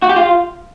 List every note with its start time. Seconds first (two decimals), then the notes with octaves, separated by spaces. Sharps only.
0.02 F#4
0.09 G4
0.16 F4